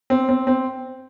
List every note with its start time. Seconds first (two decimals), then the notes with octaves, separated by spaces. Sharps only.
0.10 C4
0.29 C4
0.47 C4